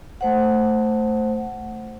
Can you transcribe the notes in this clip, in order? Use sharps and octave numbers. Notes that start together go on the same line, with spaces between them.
A3 C5 F#5